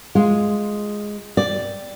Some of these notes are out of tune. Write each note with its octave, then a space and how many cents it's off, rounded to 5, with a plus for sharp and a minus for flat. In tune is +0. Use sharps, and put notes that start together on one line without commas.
G#3 +0 F4 +0
D5 +0 G5 +0